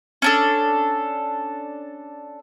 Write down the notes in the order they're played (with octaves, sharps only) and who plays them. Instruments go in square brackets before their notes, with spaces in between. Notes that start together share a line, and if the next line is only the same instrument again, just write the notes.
[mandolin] C#4 D4 A4